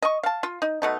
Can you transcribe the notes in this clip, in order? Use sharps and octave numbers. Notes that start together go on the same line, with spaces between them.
D#5 C#6
F5 A5
F4
D#4
B2 A3 D#4